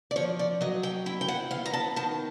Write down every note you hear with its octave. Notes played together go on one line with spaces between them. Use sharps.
D5
F3 C#5
D5
F#3 D#5
G5
E4 G5
G5
F#5
B3 F5
A#5
A5
D#3 A5